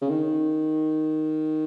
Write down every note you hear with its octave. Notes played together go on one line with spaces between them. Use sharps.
C#3
D#3